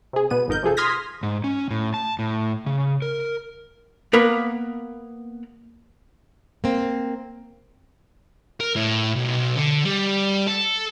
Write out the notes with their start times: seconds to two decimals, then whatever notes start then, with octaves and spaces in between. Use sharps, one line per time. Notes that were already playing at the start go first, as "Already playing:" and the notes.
0.13 C3 G#4
0.30 B2 B3 D#7
0.48 G#1 F2 D#4 A#4 G6
0.63 C3 F3 G#4 A4
0.77 C6 D#6 F6 G#6 A#6 B6
1.23 G#2
1.44 C#4
1.71 A2
1.94 A5
2.19 A2
2.66 C#3
3.02 A#4
4.13 A#3 B3 A#4 B4
6.64 A#3 C4
8.60 A#4
8.76 A2
9.15 B1
9.56 D3
9.85 G3
10.47 A4